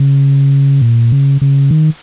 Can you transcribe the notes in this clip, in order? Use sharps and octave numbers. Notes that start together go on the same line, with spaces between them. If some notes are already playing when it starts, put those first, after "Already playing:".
Already playing: C#3
A#2
C#3
C#3
D#3